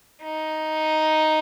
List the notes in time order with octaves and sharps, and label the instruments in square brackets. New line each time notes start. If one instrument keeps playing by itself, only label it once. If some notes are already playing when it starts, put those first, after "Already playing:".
[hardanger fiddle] D#4